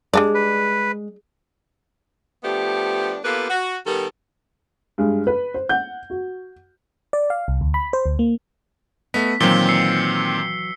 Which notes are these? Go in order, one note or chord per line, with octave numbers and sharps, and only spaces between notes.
G3 G#3 D4 D5
B4
F3 A3 B3 D4 G4
A#3 B3 F4 G4 A4 B4
F#4
D#3 G3 B3 A4 A#4
G2 G#3
B4
C5
F#5 G6
F#4
D5
F5
C2
D2
B5
C5
D2
A#3
A3 B3 D#5 B6
A#2 D#3 E3 F#3 C4 G7
E6 C7 C#7